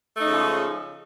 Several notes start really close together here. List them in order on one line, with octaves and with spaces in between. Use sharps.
A3 D#4 C#3 F3 G#3